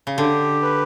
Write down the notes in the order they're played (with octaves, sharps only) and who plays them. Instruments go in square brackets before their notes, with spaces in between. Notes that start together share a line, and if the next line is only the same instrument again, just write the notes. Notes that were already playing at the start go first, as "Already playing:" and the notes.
[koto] C#3
[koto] D3 [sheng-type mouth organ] G4
[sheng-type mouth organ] B4